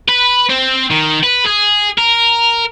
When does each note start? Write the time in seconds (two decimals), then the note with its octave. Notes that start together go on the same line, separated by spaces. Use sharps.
0.08 B4
0.50 C4
0.91 D#3
1.24 B4
1.47 G#4
1.98 A#4